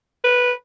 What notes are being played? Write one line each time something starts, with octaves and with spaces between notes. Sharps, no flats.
B4